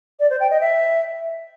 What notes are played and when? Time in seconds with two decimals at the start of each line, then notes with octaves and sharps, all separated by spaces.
0.20 D5
0.30 C5
0.40 G5
0.50 D#5
0.61 E5